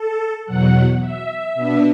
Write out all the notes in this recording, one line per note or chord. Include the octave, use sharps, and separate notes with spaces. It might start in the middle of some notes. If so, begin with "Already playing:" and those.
Already playing: A4
E2 B2 F#3 F#5
E5
B2 B3 D4